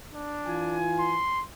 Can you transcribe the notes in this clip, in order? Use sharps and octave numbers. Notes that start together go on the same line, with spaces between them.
D4
E3 F4 G#5
C6